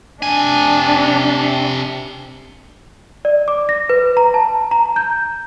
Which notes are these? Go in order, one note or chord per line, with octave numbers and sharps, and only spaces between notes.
C3 D4 G#5
D5
D6
A#6
B4
A#5
A5
A#5
G6